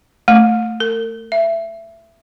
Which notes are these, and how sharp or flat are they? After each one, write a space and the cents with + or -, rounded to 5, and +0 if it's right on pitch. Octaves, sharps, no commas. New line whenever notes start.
A3 +10
A#4 -40
E5 +20